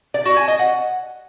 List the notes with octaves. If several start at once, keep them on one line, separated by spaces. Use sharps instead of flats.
D5
F#4
G#5
D#5
F#5